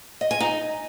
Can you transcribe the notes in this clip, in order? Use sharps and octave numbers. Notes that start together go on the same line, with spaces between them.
D#5
G#5
D#4